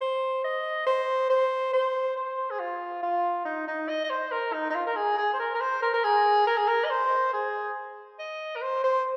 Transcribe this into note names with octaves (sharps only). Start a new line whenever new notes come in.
C5
D#5
C5
C5
C5
C5
G#4
F4
F4
D#4
D#4
D#5
D#5
C5
A#4
D#4
D#4
F4
A#4
G#4
G#4
C5
A#4
A#4
C5
A#4
A#4
G#4
A#4
G#4
A#4
D#5
C5
G#4
D#5
A#4
C5
C5